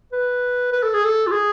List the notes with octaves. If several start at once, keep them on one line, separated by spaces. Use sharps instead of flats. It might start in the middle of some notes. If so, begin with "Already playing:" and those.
B4
B4
A4
G#4
A4
F4
G#4